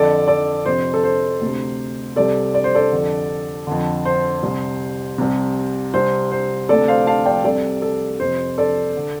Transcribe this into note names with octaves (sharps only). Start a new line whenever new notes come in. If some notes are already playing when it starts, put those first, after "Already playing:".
Already playing: F2 D3 A4 D5
A4 D5
F2 C3 C5
A4
C5
D2 C3
C2 C3 A4 D5
D5
C5
A4 D5
F2 D3
F2 D3
C5
C2 C3
C2 C3
C2 C3 C5
C5
D2 C3 A4 D5
C5 F5
F5 A5
D5 G5
C2 C3 A4 D5
A4
F2 C3 C5
A4 D5
D3